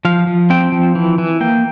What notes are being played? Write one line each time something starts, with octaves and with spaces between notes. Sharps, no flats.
F3 F5
F3
C4 G5
F3
E3
E3
A#3 G5